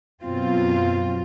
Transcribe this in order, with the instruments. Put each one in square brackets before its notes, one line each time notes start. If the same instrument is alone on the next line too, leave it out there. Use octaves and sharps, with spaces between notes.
[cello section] F#2 B2 C4 F4